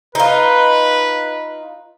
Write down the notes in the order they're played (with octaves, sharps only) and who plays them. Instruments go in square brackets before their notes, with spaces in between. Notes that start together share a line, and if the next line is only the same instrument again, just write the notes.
[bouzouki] D#4 F4 [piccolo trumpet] B4